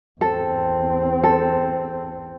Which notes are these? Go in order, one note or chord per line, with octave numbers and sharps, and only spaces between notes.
E2 C4 A4
A4